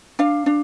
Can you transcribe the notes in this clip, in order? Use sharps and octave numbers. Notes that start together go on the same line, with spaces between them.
D4 F5
D4